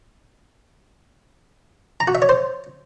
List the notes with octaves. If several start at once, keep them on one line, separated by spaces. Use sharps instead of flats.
A#5
F#4
E5
C#5
C5